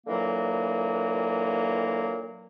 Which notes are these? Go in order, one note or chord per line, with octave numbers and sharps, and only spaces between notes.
A#2 D3 E3 F#3 A#3